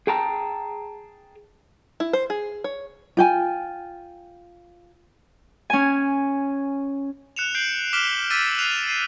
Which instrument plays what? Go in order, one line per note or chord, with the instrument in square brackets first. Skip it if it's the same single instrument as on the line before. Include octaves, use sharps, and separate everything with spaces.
[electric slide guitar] G#4 G5 A5 A#5
[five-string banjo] E4
C5
G#4
C#5
[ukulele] F4 G5 G#5
[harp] C#4 G#5
[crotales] F#6 C#7 E7 F7
G6 C7 D7 F#7
D6 F6 B6 D7 E7 G7
D6 E6 A6 B6 D#7
F#6 C7 F7
C7 D#7